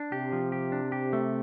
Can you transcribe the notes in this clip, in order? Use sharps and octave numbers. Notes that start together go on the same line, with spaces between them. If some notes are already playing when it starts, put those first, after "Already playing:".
Already playing: D4
C3 G4
F3
G4
D4
G4
A3